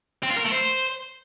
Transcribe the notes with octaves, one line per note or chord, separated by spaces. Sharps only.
C4
F4
A#4
A3
C5